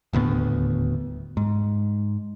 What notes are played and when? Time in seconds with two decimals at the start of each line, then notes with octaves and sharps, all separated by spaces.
0.13 D#1 D2 A2 B3
1.37 G#2